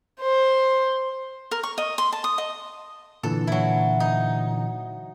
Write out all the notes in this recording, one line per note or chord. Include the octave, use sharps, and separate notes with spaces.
C5
A#4
C#6
D#5
C6
A5
D#6
D#5
A#2 D3 E3 A4
F#3 E4
D#4